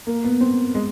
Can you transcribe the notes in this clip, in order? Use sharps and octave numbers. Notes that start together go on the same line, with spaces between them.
A#3
B3
C4
G#3